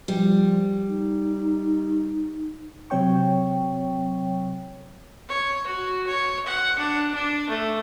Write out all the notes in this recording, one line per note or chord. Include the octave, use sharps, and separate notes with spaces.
F3 G3
D#4
C3 F#3 C4 C#5 G5 C#6
C#5
F#4
C#5
F#5
D4
D4
A3